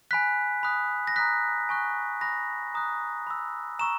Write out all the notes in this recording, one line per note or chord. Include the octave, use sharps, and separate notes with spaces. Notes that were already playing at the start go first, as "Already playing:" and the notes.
G#5 B5 F#6 B6
B5 D#6 F#6
A#6
A#5 D#6 F#6 B6
G#5 C#6 F#6
B5 D#6 F#6 A#6
A#5 D#6 F#6
B5 E6
A#5 C#6 E6 E7